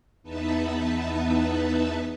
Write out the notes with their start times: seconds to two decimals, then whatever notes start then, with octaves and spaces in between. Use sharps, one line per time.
0.23 E2 B3 D#4 B4 E5 A5